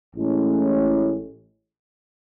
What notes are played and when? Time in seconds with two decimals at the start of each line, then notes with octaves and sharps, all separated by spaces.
0.15 A1 A2 G#3 C#4